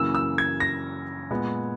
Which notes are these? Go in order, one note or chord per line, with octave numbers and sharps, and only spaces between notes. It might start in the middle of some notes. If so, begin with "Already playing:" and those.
Already playing: F#2 C#3 E3 A#3 E6
E6
G#6
A#6
A#2 G#3 B3